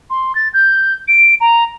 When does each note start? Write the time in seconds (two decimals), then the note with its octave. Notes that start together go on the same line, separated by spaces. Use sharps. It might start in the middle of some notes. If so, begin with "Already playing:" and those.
0.10 C6
0.35 A6
0.54 G6
1.08 D7
1.41 A#5